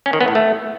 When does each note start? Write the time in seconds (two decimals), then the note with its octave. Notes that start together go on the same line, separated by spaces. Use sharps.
0.06 C#4
0.13 D#3
0.21 B3
0.28 A2
0.35 A3